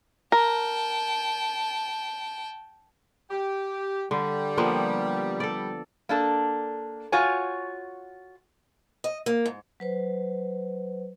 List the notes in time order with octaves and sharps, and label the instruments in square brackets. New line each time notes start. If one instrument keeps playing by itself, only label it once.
[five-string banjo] A#4 [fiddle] G5 A5
[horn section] G4
[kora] D3 [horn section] G3
[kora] F3 A#3 B3
A4 D5
[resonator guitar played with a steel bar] A#3 D4 A4
F4 F#4 C#5 G#5
[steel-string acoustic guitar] D#5
A#3
G#2
[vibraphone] F#3 B4 C5